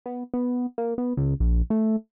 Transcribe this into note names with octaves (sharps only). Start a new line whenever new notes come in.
B3
B3
A#3
B3
C#2
A#1
A3